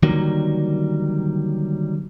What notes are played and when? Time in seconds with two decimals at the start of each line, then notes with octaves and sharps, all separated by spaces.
0.03 D3 D#3 F#3 G3 A#3